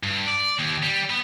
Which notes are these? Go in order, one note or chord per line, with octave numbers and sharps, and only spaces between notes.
G2
D5
D#2
G3
B3